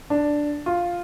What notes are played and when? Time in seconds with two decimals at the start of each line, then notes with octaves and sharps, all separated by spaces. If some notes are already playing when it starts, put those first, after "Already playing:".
0.10 D4
0.66 F4